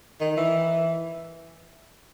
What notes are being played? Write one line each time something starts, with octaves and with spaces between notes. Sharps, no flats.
D#3
E3